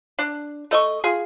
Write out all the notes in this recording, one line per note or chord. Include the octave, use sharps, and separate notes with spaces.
D4
A3 D#5 C#6
F4 G#4